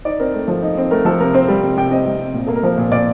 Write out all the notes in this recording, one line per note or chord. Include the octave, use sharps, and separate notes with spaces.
D#4 D5
C4 A#4
A3
F3
D#4
C4
A3 A#4
F3 A4
C3 A#4
C4 C5
G3
C3
C3 G5
C4 D#5
G3
C3
A#2
A#3 A4
A#4
F3 C5
A#2
A#2 D5